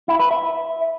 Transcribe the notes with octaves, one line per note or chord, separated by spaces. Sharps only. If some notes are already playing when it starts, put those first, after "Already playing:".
E4
B4
E5